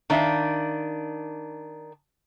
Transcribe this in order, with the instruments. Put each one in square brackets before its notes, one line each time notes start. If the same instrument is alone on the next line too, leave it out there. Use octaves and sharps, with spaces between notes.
[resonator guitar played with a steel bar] D#3 D4 E5 F5